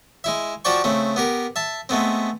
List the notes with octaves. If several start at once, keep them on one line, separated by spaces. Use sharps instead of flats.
G#3 E4 E5
F3 F#4 C5 D5 G5 C#6
C#3 A3 C4
B3 G4 A#4
E5 A5
G#3 A3 B3 C4